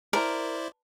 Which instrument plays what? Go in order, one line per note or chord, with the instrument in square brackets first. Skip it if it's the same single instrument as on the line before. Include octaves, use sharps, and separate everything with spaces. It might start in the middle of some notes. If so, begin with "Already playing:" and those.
[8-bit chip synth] E4 C5 D5 [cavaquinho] A#4